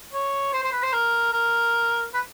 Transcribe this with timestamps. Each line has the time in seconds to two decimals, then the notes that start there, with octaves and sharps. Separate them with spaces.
0.13 C#5
0.53 C5
0.63 C5
0.73 B4
0.83 C5
0.93 A#4
1.32 A#4
2.14 B4